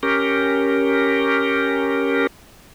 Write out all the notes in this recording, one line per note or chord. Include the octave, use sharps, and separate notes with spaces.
C#4 G4 A#4